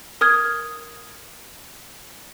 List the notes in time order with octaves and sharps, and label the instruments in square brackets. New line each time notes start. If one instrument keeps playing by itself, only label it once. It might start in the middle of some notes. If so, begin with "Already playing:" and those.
[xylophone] A#4 D#6 F6 G#6